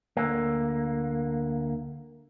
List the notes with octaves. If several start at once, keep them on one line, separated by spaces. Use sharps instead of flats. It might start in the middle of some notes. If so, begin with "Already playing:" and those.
D2 D3 A#3